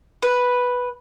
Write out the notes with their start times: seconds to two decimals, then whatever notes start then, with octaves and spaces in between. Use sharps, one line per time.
0.22 B4